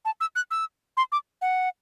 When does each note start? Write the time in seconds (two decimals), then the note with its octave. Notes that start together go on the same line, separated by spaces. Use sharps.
0.05 A5
0.20 E6
0.35 F#6
0.51 E6
0.97 C6
1.12 D6
1.41 F#5